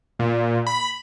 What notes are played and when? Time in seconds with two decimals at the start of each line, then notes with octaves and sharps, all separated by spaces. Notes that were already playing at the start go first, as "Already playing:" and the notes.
0.19 A#2
0.67 B5